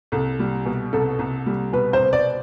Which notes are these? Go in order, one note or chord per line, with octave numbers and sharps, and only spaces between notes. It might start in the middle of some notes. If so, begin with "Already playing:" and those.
C2 A4
G3
B2
C2 A4
C2
G3
B2 B4
C5
C2
D5